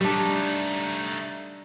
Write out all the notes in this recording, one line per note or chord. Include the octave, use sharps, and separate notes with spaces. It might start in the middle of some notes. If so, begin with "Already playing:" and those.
G3 A3 D4 D#4